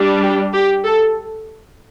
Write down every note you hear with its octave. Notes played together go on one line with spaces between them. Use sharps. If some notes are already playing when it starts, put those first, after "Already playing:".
Already playing: G3 D4
G4
G4
A4